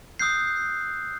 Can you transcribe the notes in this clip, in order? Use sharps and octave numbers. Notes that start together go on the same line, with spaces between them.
D#6 E6 F#6 G6 C7